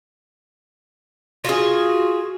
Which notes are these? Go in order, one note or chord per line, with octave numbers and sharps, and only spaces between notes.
F4 F#4 G#4